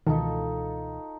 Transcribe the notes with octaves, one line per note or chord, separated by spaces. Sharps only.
C#2 B2 D#3 E3 D#4 F4 A4